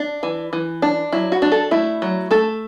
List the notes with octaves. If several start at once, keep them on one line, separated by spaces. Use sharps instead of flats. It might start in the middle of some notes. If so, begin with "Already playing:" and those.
Already playing: D4
E3
E3
D4
F#3 E4
F#4
D4
A4
A3 E4
F#3
A3 A4